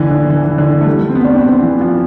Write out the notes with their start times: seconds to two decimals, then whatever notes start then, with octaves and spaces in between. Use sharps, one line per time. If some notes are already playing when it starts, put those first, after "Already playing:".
Already playing: D3 E3
0.11 D3
0.30 E3
0.44 E3
0.58 D3
0.81 A3
0.87 G3
1.10 C4
1.15 B3
1.25 D4
1.34 C4
1.43 B3
1.62 E3
1.81 F3